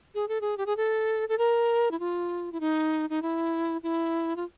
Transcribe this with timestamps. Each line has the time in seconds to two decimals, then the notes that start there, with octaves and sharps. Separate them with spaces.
0.15 G#4
0.28 A4
0.41 G#4
0.57 G4
0.66 G#4
0.77 A4
1.29 A4
1.38 A#4
1.91 E4
2.00 F4
2.52 E4
2.60 D#4
3.10 D#4
3.22 E4
3.83 E4
4.36 F4